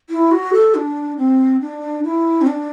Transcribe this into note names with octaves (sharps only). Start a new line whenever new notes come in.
E4
F#4
A4
D4
C4
D4
E4
C4
D4